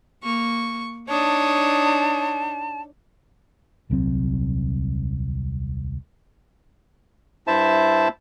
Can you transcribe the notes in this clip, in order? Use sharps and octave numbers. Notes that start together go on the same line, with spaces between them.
A#3 C#6
D4 D#4 C#5 A5 D#6
D#1 C2 F#3 C4
G2 E4 C5 E5 A5